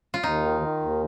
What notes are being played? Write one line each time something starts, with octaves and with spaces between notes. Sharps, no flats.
F4
D#2 D#4
D#3
D#3
D#2